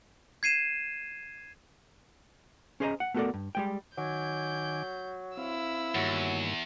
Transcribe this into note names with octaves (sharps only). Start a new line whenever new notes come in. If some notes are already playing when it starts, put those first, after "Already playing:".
G#6 C7 D#7 E7
C#4 G#4 C5 C#5 D#5 A#5
F#5
A3 B3 F#4 A4 A#4 D5
G2
G3 G#3 G5
D#3 F#3 G#5 D6 G6
C4 E4 F5 E6
E2 G2 D#3 F#3 A#3